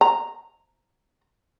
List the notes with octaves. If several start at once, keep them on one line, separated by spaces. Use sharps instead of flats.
A#5